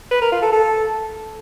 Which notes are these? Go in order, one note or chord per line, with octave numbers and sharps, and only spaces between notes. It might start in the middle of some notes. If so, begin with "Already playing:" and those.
B4
A#4
F4
A4
A4